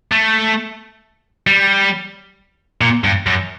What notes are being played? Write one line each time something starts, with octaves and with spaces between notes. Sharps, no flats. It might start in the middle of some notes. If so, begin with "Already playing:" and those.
A3
G3
A#2
G2
F#2